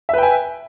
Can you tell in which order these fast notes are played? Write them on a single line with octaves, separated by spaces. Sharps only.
E5 B4 G5 G#5